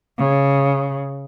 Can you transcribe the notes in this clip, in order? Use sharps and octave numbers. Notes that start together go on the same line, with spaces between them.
C#3